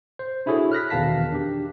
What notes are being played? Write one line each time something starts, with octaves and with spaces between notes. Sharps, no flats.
C5
D4 E4 F#4 G#4 A4 C#5
F6 F#6 A#6 B6
E2 B2 D#3 F5 A5 B6
D4 G4